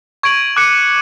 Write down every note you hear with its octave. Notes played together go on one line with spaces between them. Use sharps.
C#6 G#6 D7 F#7
D6 F#6 C#7